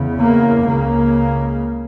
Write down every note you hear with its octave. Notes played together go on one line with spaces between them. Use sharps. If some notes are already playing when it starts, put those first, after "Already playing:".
Already playing: E2 C#3
A#3
C#2 C#3 A#3